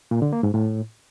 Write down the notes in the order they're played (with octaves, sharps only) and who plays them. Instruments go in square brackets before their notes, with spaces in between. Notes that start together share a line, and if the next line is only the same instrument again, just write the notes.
[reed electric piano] A#2
D3
A#3
G#2
A2